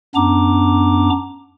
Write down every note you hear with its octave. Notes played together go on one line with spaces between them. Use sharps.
F#2 B3 D4 A#5 D6